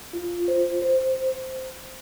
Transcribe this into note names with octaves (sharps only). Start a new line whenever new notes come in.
F4
C5
C5